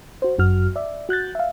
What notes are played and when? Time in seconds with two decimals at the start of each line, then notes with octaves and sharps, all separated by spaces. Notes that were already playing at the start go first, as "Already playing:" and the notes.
0.22 F#4 C5
0.38 G1 F#2 F#4 F6
0.76 D5 E5
1.09 F#4 F#6 G6 A6
1.35 E5 F5